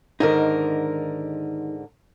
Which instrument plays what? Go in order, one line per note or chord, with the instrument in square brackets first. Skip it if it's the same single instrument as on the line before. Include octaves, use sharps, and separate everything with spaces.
[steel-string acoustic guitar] G#2 D3 A#4 [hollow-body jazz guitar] D#3 D#4